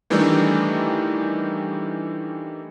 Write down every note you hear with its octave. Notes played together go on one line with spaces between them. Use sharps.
D#3 E3 G3 A3 D4 D#4